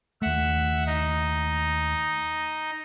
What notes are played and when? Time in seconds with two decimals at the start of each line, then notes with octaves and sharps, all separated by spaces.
0.22 D#2 A3 E5 F#5
0.86 D#4